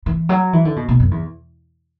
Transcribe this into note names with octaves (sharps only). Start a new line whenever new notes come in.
E3
F#3
E3
D3
B2
B2
F#2
E2